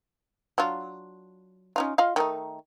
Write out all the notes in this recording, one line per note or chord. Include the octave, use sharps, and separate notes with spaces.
F#3 D4 F4
C#4 D#4 F4
F4 D#5 F5
D#3 A3 D#4